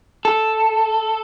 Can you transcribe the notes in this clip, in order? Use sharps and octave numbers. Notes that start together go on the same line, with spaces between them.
A4